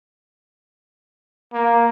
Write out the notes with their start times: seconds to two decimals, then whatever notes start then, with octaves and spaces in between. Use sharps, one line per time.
1.53 A#3